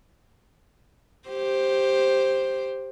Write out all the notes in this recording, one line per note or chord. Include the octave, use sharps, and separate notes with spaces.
G4 C5